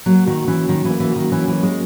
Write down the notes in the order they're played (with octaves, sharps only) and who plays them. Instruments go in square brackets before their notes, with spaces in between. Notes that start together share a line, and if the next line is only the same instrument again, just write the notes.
[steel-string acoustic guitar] F#3 [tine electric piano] A#3
[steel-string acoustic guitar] D#3 [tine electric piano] F#4
[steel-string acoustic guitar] E3 [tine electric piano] C#4
[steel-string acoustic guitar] D#3 [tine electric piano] F#3
[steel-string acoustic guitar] E3
[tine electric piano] A#3
[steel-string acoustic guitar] E3
[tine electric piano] F#4
[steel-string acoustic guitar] D#3
[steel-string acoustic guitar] E3 [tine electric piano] C#4
[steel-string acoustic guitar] E3
[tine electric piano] F#3
[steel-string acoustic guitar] G#3